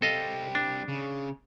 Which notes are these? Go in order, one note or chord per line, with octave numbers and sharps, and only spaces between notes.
G3 C4 A4 D#5 F5
D4
C#3